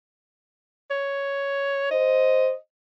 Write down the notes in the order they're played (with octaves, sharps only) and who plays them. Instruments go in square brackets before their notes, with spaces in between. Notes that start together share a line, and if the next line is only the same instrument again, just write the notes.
[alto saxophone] C#5
[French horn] C5 [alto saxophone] D#5